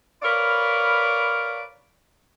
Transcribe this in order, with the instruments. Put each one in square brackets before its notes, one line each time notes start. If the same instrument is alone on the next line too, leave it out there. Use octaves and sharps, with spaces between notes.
[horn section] A#4 B4 C#5 D5 F5 B5